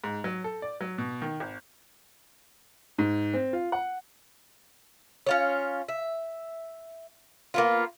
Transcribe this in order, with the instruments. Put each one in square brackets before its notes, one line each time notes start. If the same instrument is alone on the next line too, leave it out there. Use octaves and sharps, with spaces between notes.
[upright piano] G#2
F#3
A4
D5
F#3
B2
D#3
G#1
G#2
C4
F4
F#5
[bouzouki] C#4 F4 C#5
E5
A#3 B3 F4